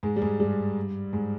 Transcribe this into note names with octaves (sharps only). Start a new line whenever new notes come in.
G#2 G#3
G3
G#2 G#3
G2 G3
G#2 G#3